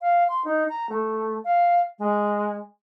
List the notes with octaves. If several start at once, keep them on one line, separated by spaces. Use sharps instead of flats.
F5
C6
D#4
A#5
A3
F5
G#3